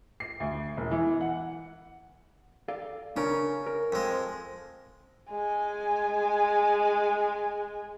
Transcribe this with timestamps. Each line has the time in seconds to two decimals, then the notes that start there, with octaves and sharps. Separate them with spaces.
0.20 C7
0.40 D2
0.77 E1
0.91 E3
1.21 F#5
2.68 A4 D5 F5
3.17 C#3 D4 A#4 A#5
3.66 A#4
3.92 F2 G#3
5.30 G#3 G#5